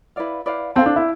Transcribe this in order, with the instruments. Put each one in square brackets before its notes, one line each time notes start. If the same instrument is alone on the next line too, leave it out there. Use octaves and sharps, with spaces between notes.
[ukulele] E4 B4 D5 F5
E4 B4 D5 F5
[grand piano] C4 [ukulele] A4 C5 F5 A5
[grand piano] D4
E4